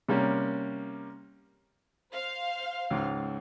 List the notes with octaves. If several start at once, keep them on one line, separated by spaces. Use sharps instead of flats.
C3 G3 A#3 C#4
C5 F5
C#2 G#2